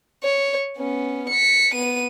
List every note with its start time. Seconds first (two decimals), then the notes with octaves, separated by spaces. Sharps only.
0.23 C#5
0.78 B3 C#4
1.29 B6 C#7
1.75 B3 D#7